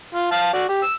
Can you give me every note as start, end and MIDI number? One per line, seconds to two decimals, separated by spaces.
0.15 0.29 65
0.32 0.50 77
0.32 0.50 81
0.53 0.65 66
0.53 0.65 74
0.69 0.82 67
0.83 0.93 88